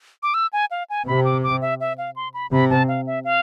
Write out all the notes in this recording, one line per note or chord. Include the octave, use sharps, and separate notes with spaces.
D6
E6
G#5
F5
G#5
C3 B5
D6
D6
E5
E5
F5
C6
B5
C3 B5
A5
F5
E5
F5